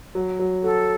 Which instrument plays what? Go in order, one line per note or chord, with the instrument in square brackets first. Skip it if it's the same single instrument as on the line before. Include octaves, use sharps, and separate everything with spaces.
[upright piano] F#3
F#3
[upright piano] F#4 [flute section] A4